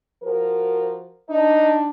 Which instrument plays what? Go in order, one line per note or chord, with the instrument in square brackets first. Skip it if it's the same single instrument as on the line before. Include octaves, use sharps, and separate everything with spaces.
[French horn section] F3 F#4 A#4
[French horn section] D4 [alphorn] D#4